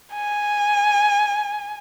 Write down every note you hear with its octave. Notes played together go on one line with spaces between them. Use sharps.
G#5